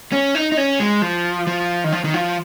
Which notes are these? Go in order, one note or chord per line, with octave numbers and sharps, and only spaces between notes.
C#4
D#4
D#4
C#4
G#3
F3
F3
D#3
F3
D#3
F3